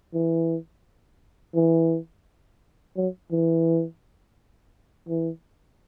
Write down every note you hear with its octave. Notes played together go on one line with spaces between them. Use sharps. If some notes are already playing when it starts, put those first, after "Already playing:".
E3
E3
F#3
E3
E3